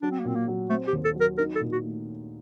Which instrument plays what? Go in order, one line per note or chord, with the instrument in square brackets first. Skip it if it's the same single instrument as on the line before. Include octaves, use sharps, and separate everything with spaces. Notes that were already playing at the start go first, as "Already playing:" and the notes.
[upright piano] F#3 [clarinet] D4
[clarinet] C4
A#3
[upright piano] A#2 [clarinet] C4
[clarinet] A#3
[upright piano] F#3
[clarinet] A3 [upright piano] C4
[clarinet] G4
[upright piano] D#2
[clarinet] A4
[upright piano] F#3
[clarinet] A#4
[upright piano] D#4 [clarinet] A#4
[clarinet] A4
[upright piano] A#2
[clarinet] F#4
[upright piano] A3